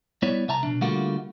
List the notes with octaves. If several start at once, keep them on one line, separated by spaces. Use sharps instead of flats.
G3 B3 E4 C#5 D5
C2 E5 A5 A#5
B2 F3 D4
D3 G3 A3 A#3 F4 F#4